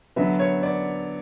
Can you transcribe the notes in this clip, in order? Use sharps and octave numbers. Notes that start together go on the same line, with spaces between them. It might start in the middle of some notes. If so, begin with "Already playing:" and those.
D3 F#3 B3 E5
C#5
D5